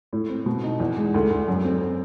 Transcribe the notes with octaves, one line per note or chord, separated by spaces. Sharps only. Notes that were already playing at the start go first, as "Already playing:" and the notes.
A2
C4
B2
D#4
E2
G#3
D2
D2
F#2
C4